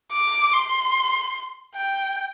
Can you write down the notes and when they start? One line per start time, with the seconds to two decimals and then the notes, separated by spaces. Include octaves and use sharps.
0.13 D6
0.53 C6
1.76 G5